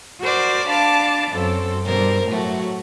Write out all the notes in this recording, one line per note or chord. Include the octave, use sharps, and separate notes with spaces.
F#4 A#4 C5 D5
D4 F5 A5 B5 D6
F#2 C4 A4
G2 B2 A#4 C5
A2 F#3 A3 F#4